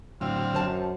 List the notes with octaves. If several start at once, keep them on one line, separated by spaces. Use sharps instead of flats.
A2 D3 F#3 C4 F5
F#2 C5 A5